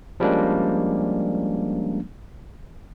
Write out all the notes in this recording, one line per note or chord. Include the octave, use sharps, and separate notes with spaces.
F3 G3 G#3 A#3 C#4 D4